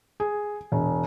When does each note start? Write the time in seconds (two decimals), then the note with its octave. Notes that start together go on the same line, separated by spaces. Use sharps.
0.20 G#4
0.72 E1